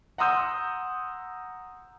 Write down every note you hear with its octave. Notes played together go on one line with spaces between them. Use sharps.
F#5 A#5 C6 D#6 E6 G6